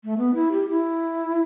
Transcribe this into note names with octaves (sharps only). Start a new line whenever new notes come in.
A3
B3
E4
G4
E4